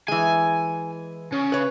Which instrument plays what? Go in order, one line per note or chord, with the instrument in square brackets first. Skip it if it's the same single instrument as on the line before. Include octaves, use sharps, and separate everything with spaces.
[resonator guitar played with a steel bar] E3 G#3 [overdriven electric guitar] G#5
[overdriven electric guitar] C#3
[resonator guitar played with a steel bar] B4 C#5